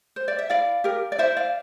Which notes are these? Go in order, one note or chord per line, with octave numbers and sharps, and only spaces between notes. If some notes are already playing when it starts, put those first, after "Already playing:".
C5
D5
E5
E4 D5 F5
G4 A#4
D5
E4 C5 E5
D5 F5